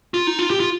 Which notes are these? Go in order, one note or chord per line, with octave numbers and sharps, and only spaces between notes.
F4
D#4
F4
G4
F4